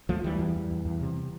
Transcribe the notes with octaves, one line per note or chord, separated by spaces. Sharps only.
D2 F3 A3
D2 E3 G3
E2
E2
E2
E2
C3